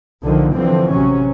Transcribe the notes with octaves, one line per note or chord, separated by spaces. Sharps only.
B1 D3 D#3 F3
D3 E3 F3 C4
A1 C3 F#3 C#4